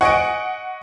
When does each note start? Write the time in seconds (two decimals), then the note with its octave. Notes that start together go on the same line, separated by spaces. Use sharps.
0.01 D#5 F#5 G#5 C#6 D7